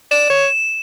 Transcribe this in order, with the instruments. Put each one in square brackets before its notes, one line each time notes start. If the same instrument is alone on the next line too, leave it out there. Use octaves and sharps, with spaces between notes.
[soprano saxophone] D5 [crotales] E7
[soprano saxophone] C#5